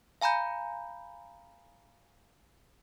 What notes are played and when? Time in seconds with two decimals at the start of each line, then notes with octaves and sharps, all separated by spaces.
0.21 F5 G#5 A#5 B5 G6